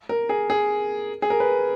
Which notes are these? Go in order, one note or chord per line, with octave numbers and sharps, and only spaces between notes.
A#4
G#4
G#4
G#4
A#4
B4